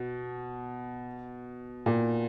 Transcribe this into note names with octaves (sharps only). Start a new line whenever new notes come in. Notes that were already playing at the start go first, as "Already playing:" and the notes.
Already playing: B2
A#2